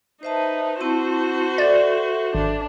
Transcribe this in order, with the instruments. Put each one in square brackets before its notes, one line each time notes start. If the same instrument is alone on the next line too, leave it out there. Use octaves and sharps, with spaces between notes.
[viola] D#4 B4 [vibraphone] C5 E5 A5
[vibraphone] C4 E4 A5 [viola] F#4 C5
[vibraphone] A4 E5 [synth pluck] D5
[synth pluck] G#1 [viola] D4